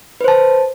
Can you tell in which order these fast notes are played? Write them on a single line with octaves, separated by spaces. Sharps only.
B4 C5 A5